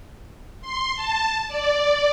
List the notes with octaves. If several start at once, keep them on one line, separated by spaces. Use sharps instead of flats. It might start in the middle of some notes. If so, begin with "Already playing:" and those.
C6
A5
D5